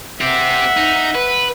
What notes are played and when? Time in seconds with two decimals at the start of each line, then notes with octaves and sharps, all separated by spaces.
0.21 C4 G4 E5 F#5
0.77 D#4
1.15 B4